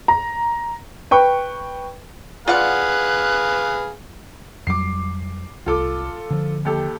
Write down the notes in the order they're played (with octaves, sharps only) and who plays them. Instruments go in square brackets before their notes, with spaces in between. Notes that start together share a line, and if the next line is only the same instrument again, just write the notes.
[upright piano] A#5
B4 G5 C#6
[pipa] F4 D5 F#5 [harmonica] G#4 B4 F5 [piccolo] F#6
[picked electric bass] F2 F#3 G3 [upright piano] D6 C7
[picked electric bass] C2 [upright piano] F4 A4 D6
[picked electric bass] D3 F3
[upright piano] D#2 G4 A4